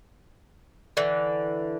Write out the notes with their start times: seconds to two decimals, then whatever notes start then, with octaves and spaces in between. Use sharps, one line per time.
0.97 D3 E3